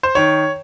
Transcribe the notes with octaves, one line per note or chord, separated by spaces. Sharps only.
C5
D#3 C#5